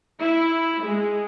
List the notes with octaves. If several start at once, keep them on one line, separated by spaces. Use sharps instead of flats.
E4
G#3